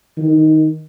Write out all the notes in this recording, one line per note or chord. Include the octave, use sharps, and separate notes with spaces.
D#3